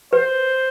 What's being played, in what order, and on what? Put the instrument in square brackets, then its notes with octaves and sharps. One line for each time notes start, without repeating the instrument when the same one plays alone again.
[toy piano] B4 [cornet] C5